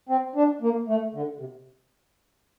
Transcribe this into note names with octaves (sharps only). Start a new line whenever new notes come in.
C4
D4
A#3
A3
D3
C3